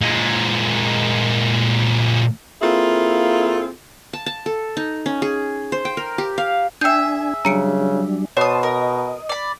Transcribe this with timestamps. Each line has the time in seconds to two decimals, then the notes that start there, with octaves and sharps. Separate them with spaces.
0.02 A#2 G#3
2.62 A#3 C4 E4 F4 G#4 A4
4.13 A5
4.26 A5
4.46 A4
4.77 D#4
5.06 C#4
5.22 G#4
5.72 C5
5.85 G5
5.97 A#4
6.18 G4
6.38 F5
6.81 D4 G#4 E5 G5 G#5 G6
7.45 C#3 F#3 G3 D4 A#5 C#7 D7
8.37 B2 C5 C#5 A5 D#6
8.63 A#4 D#5
9.29 D5 B5